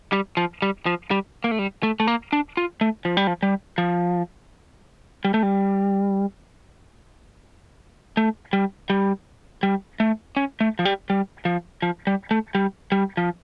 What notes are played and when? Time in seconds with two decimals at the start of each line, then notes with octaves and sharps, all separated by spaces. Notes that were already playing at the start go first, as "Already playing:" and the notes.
0.13 G3
0.37 F3
0.62 G3
0.86 F3
1.11 G3
1.44 A#3
1.51 A3
1.59 G3
1.83 A3
2.00 A3
2.07 A#3
2.33 D4
2.57 F4
2.81 A3
3.05 F3
3.17 G3
3.27 F3
3.43 G3
3.78 F3
5.25 G3
5.34 A3
5.43 G3
8.17 A3
8.53 G3
8.90 G3
9.63 G3
10.00 A3
10.37 C#4
10.61 A3
10.79 F3
10.85 G3
11.10 G3
11.45 F3
11.82 F3
12.07 G3
12.31 A3
12.55 G3
12.92 G3
13.17 F3